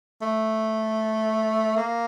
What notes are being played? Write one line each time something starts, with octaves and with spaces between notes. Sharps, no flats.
A3
A#3